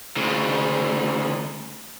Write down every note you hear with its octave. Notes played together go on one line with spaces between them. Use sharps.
D2 C#3